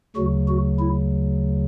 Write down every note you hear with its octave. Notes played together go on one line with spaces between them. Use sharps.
D2 C#3 F#3 F#4
F#4
E4